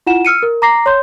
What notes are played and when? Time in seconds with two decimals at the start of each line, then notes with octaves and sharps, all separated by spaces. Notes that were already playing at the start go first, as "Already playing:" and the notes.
0.06 E4 F4 F#5 E7
0.25 E6 F6 C#7 D#7
0.43 A#4
0.62 A#5 D6 A#6 C7
0.86 C#5 C6 G6